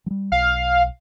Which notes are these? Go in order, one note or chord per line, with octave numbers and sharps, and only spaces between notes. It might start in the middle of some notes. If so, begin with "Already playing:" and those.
F#3 G3
B1 F5